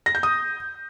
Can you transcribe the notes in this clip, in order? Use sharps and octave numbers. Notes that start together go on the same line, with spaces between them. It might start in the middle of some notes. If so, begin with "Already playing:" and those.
A#6
G6
D#6